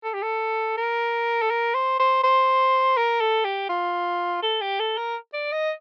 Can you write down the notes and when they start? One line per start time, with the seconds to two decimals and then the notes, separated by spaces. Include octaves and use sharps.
0.04 A4
0.14 G4
0.23 A4
0.77 A#4
1.42 A4
1.50 A#4
1.75 C5
2.00 C5
2.24 C5
2.97 A#4
3.21 A4
3.45 G4
3.70 F4
4.43 A4
4.61 G4
4.80 A4
4.97 A#4
5.34 D5
5.52 D#5